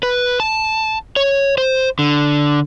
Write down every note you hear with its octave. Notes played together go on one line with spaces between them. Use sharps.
B4
A5
C#5
C5
D3